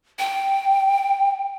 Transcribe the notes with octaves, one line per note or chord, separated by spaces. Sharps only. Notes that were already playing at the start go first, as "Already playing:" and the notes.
G5